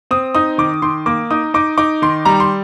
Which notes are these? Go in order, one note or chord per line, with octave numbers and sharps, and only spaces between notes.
C4 D#6
D#4 D#6
D#3 D6
D#3 C6
A#3 D6
D#4 D#6
D#4 D6
D#4 D6
D#3 C6
G3 A#5
C6